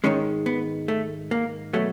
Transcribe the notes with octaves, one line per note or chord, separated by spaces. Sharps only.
G#2 D#3 G#3 C#4
B3
A3
A#3
B2 F#3 A3